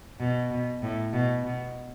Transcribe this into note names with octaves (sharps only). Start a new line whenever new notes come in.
B2
B2
A2
B2
B2